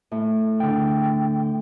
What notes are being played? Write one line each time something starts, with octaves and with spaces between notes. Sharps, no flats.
A2
D3 G5